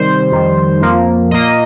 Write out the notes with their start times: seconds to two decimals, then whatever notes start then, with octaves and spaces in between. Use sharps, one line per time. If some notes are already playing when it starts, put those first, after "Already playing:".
Already playing: C3 D#3 G3 C5
0.31 F2 D#3 G3
0.81 F2 F3 A#3
1.31 A#2 A#3 D#5